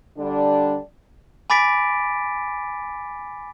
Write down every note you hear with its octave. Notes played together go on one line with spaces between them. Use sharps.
D3 G3 D4
G#5 B5 D6 A6 B6 D7